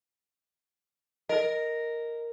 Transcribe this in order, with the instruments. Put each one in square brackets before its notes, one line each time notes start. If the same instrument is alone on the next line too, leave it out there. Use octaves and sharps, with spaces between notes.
[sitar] A#4 [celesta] D#5